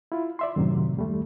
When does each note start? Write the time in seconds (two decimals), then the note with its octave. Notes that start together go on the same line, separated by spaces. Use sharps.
0.12 E4 F4
0.39 D5 E5 C6
0.56 F#2 A2 C3 D#3 F#3
0.97 D#2 G3 A3